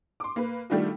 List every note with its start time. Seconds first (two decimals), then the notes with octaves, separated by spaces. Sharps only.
0.20 C6 D6
0.36 A#3 B4
0.70 D#3 G3 A3 D4 F4 F#4